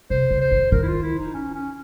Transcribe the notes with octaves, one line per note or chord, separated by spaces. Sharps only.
C3 C5
C#3
C5
D#3
D#3 A#4
E4
F4
E4
D#4
C#4
C#4